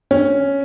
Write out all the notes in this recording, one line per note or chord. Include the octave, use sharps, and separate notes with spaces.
C#4